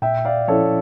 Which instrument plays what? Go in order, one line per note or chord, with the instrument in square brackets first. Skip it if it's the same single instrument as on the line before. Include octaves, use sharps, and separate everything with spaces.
[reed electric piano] A#2 [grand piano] E5 G5
[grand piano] D5 F5
[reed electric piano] F3 C#4 E4 [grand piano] A4 C#5